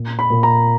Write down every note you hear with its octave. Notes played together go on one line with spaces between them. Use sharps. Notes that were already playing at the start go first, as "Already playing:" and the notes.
Already playing: A#2
B5
A#2
A#5